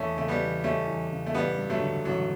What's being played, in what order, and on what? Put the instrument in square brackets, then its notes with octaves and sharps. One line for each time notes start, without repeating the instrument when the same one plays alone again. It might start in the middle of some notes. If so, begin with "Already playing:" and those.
Already playing: [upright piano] E2 [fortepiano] A3 C#4
[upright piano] C#3 [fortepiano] A3
[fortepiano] G3 B3
[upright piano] E3
[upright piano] G3 [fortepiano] A3 C#4
[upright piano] E2
C#3
[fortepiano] A3
[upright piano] A1 [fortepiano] G3 B3
[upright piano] G2
[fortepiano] F#3 A3
[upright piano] D3
[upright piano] A1 [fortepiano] F#3